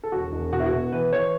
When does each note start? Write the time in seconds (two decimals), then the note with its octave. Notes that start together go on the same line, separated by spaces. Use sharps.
0.03 A4
0.12 E1 F#4
0.32 E1
0.52 B2 F#4
0.60 E4
0.66 F#4
0.72 B2
0.92 E3 B4
1.12 E3 C#5